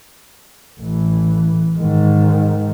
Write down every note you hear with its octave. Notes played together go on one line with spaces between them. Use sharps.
A1 E3
G#2 D#3